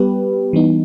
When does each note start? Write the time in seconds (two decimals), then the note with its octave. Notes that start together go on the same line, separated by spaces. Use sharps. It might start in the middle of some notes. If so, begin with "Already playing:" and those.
Already playing: G3 B3 G4 B4
0.53 E3 G3 B3 D#4